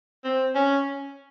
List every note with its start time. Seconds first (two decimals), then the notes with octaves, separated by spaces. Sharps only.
0.24 C4
0.55 C#4